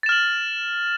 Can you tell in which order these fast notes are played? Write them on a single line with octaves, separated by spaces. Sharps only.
A6 E7 F6 F#7